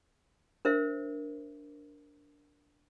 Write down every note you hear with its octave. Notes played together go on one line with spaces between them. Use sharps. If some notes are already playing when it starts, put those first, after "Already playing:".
D4 A#4 C5 E5